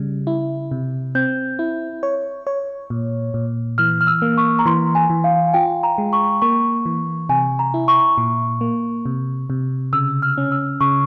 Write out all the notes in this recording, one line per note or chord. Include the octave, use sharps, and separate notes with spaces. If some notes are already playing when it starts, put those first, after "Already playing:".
Already playing: C#3 G3
E4
C3
C4 G6
E4
C#5
C#5
A#2
A#2
E3 F6
F6
E6
A#3
C#6
A#5
E3 C6
G#5
E3
F5
G#5
F4 G5
A#5
G#3
C#6
A#3 C#6
E3
C3 G#5
A#5
E4
C#6
A#2
A#3
C3
C3
C#3 E6
F6
C#4
E6
C#3 C#6